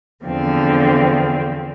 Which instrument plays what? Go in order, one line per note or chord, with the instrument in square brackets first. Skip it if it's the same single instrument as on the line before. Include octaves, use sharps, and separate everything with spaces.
[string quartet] E2 D3 F3 C4